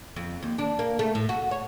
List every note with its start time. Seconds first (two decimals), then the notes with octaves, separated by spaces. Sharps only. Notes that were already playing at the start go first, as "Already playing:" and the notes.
0.16 F2
0.43 D#2
0.58 D4
0.79 A#3
0.99 A3
1.15 A2
1.29 F#4
1.51 C#5